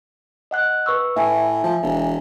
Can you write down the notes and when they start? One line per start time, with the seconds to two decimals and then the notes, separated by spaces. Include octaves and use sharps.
0.51 D#5 F#5 F#6
0.86 B4 C#6 E6
1.16 A2 E5 G#5
1.64 F3
1.82 E1